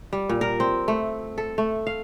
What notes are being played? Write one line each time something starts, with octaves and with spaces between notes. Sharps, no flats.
G3
A#2
A#4
C4
A3
A4
A3
F5